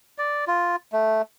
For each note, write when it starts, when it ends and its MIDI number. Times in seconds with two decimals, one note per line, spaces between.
0.18 0.45 74
0.48 0.76 65
0.93 1.22 57